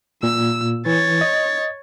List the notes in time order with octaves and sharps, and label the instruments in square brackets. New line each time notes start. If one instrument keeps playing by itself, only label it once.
[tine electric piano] A#2 [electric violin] E6
[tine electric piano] E3 [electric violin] C#5 A6
[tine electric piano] D#5